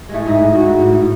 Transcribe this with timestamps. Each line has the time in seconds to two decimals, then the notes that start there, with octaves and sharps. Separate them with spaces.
0.09 A2 G#3 A3
0.26 G#2 G#3
0.40 A2
0.53 G#2 F#4
0.66 G#2
0.80 A2
0.93 A2